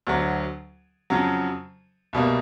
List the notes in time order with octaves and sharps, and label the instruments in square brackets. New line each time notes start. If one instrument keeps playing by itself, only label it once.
[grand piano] D2 D3 F#3
F2 C#3 F#3
C2 B2 G3 A#3